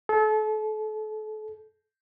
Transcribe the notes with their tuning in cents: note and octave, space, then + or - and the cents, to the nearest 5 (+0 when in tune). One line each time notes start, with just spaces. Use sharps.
A4 -35